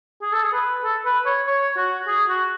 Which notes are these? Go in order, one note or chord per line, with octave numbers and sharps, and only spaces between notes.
G#4
A4
G#4
B4
A4
B4
C#5
C#5
F#4
G#4
F#4